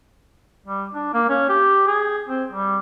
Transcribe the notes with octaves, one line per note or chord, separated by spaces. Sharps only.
G3
D4
A#3
C#4
G4
G#4
C4
G3